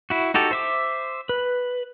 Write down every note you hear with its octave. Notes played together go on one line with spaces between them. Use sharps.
E4 F#4
D#4 F#4 G4 A4
C5 E5 D6
B4